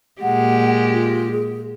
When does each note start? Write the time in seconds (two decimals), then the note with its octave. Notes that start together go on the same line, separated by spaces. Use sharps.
0.22 A#2 G#3 G4 F#5
0.93 F4
1.31 G#4